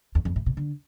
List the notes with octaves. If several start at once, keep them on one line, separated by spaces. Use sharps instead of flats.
E2
F2
A2
B2
D3